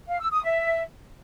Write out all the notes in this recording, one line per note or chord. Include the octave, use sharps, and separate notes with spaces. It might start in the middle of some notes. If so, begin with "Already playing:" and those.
F5
E6
D#6
E5